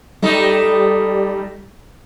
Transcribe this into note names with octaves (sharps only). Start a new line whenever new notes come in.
G3 A3 D#4